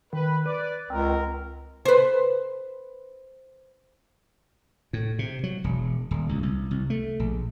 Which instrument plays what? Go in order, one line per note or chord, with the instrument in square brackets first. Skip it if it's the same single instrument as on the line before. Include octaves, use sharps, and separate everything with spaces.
[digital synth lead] D#3 [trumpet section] B4
[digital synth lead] B4 [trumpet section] D5
[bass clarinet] C#2 [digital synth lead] C4 [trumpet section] A#4
[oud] B4 C5
[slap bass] A2
C3
F#3
E1
D#1
C#2
C2
C2
A3
A#1